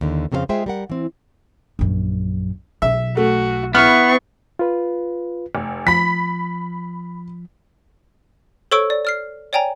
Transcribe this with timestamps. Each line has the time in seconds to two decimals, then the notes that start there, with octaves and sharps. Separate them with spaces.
0.01 D#2 D3
0.32 F2 C#3 C4 A4 C5 F5
0.49 G#3 F4 G#4 C5 E5 G5
0.66 G3 A#4 F#5
0.90 E3 C4
1.79 A#1 F#2
2.82 B1 E5
3.17 A3 F#4
3.75 B3 E4 C#6 F6
4.59 F4 B4
5.55 F1
5.87 F3 B5 B6
8.72 A4 C5 C#5 C#6 E6 D7
8.90 D5
9.05 D5 F6 C7
9.53 C#5 D5 G5 G#5 A#5